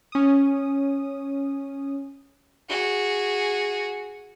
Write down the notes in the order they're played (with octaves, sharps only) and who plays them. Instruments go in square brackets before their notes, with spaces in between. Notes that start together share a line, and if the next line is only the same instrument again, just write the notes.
[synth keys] C#4 D#6
[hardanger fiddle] F#4 G#4